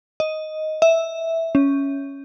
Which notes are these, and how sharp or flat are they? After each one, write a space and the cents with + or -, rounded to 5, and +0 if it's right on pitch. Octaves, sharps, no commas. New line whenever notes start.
D#5 +5
E5 -5
C#4 +5